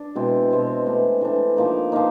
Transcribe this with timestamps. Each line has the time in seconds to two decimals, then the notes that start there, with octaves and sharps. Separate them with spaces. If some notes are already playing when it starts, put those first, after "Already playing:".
Already playing: D4
0.15 B2 G#3 C4 E4
0.50 B2 G#3 C4 E4
0.86 E3 A3 D4
1.21 E3 A3 D4
1.57 F3 A#3 D#4
1.92 F3 A#3 D#4